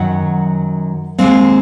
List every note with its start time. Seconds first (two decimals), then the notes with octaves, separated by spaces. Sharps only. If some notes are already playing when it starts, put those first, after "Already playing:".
Already playing: F#2 D#3 F#3 F#5
1.18 D#2 D#3 G#3 C4 F5